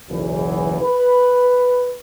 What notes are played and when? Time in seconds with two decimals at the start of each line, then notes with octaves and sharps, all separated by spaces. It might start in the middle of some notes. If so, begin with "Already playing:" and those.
0.10 F#1 B1 E2 E3
0.82 B4